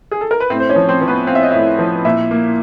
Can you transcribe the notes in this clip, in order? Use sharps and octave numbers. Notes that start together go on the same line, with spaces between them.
G#4
A4
A#4
B4
A2 C4 C5
C5
C#4 C#5
F3
C4 C5
F3
B3 B4
C4 F5
E5
D#5
A2 E4 E5
F3
A#2 E4 E5
A#3